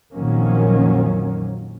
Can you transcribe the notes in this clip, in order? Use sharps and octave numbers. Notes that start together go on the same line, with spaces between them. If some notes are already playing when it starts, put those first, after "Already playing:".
A#1 F2 D#3 F#3 A#3 C#4